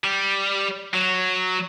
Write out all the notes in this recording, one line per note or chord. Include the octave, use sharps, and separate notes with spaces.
G3
F#3